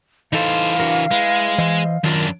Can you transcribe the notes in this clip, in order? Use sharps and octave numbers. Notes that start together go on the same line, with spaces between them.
E3 D#4 A4 C5 F5
D4 F#4 A#4
G#3 E4 B4
E3 C5 D#5
F#2 D#3 D4 F4 A#4